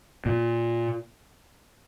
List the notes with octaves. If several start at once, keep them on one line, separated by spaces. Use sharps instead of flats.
A#2